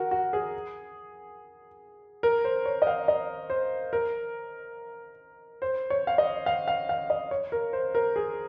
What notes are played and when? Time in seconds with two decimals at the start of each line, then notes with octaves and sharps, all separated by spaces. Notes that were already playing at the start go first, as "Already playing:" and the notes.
Already playing: F#4 A#4
0.11 F#4
0.33 G#4
2.23 A#4
2.44 C5
2.65 C#5
2.82 D#5
2.87 F5
3.08 D#5
3.50 C5
3.93 A#4
5.62 C5
5.90 C#5
6.07 F5
6.18 D#5
6.46 F5
6.68 F5
6.89 F5
7.10 D#5
7.31 C#5
7.52 A#4
7.73 C5
7.95 A#4
8.16 G#4